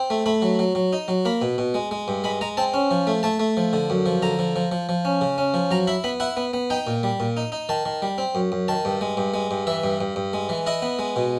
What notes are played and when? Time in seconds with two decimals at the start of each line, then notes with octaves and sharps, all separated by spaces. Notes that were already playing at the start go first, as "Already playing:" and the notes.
Already playing: C4
0.10 A3
0.26 A3 B5
0.42 F#3
0.59 F#3
0.75 F#3
0.93 D#4
1.08 F#3
1.25 A#3 B5
1.42 B2
1.58 B2
1.74 G#3
1.91 G#3
2.08 G2
2.24 G#3 B5
2.41 G#3 A#5
2.57 C4 A5
2.74 C#4
2.91 F3
3.07 A3
3.23 A3 A5
3.40 A3
3.57 F3
3.73 D3
3.90 F#2
4.06 F3
4.22 D3 A#5
4.39 F3
4.56 F3
4.72 F3
4.89 F3
5.05 C#4
5.21 C#3
5.38 C#4
5.54 F3
5.71 F#3 A#5
5.87 E4 B5
6.04 B3 B5
6.20 E4 F#5
6.37 B3
6.53 B3
6.70 D#4 G5
6.87 A#2
7.03 G3
7.20 A#2
7.37 D#4
7.52 D#4
7.69 D#3 A5
7.85 D#3
8.02 G3
8.18 C4
8.35 F#2
8.52 F#2
8.68 D#3 A5
8.85 G2
9.01 G#3
9.17 G2
9.34 G#3
9.51 G2
9.67 E3 E5
9.84 G2
10.01 G2
10.16 G2
10.33 G#3
10.49 E3
10.66 E4 D#5
10.82 B3
10.99 G#3
11.16 B2